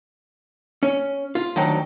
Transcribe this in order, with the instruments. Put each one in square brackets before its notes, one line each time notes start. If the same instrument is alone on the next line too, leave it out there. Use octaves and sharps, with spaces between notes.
[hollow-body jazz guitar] C#4
F4
D2 D#3 F#3 G5